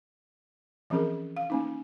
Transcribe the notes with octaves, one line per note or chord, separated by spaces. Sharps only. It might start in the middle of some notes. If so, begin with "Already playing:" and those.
E3 F3 C4 C#4 G#4 A#4
F5
A#3 C#4 D#4